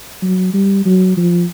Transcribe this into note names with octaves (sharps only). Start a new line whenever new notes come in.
F#3
G3
F#3
F3